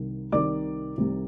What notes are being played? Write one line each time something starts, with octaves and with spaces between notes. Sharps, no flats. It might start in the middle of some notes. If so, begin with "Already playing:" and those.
Already playing: C2 C3 D#3
C2 C3 D#3 D5 D6
C2 C3 D#3